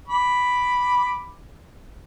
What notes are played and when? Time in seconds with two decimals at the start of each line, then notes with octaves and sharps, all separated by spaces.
0.08 B5 D6